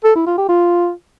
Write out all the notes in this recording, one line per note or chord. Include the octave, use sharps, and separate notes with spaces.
A4
E4
F4
G4
F4